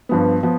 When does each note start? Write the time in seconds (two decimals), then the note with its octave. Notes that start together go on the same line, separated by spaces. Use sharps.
0.09 G2 F3 B3
0.43 F3 B3